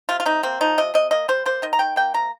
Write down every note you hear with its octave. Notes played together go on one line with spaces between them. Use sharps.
C3 F4
F4
C3 D#4
A#3 C4
F3 D#4
C3 D#5
C3 D#5
A#3 D#5
G3 C5
A#3 C5
D#3 D#5
A#5
D#3 G5
A#3 G5
C3 A#5